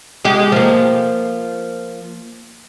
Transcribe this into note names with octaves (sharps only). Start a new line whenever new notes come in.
G#3 G4
F3 A#3